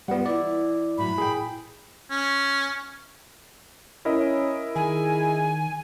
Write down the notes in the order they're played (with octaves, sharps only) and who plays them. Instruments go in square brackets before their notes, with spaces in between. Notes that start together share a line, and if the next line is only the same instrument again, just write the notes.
[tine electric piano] G3 B3 [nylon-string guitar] F4 F#5
[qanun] E3 E4 [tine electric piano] D5
[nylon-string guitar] A2 F#3 [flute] B5
[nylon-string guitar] A#2 [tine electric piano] G#4 G5
[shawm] C#4
[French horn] C#4 [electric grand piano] E4 A#4 D#5
[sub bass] D#3 [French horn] G#4 [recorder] G#5